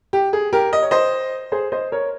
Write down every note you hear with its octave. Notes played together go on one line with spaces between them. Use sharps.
G4
G#4
G4 A#4
D#5
C#5
C5 D#5
G#4 C5
C5 D#5
A#4 C#5